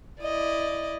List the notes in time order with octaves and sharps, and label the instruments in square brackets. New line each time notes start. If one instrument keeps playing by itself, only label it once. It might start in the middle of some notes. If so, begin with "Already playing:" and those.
[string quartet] E4 D5 D#5